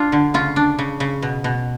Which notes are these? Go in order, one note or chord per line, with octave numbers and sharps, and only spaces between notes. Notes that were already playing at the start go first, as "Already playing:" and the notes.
Already playing: D4 F4
D3
C#3 F4
D4
C#3
C#3
B2
B2